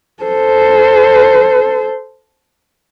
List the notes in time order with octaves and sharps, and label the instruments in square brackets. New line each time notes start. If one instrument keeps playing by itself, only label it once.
[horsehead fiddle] A4 C5